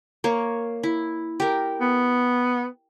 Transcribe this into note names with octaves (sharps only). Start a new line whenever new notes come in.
A#3 C#5
E4
G4 A#4
B3